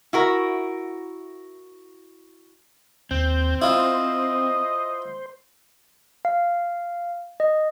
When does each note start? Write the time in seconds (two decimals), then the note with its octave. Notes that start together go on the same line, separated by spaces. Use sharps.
0.13 E4 F#4 A#4
3.11 D#2 C4 G6
3.62 E4 F4 C5 D#5
6.25 F5
7.40 D#5